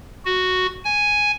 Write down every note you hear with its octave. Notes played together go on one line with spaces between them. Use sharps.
F#4
G#5